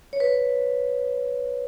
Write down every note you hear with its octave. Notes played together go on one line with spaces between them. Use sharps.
C#5
B4